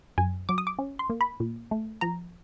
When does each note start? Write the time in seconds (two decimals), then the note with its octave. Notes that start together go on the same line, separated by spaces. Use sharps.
0.18 F#2 G#5
0.49 F#3 D6
0.58 D#6
0.67 D6
0.79 C#4
0.99 C6
1.10 A#3
1.21 B5
1.40 A#2
1.71 A3
2.01 F3 A#5